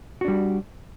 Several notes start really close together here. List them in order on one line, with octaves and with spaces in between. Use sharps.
F#4 D4 G3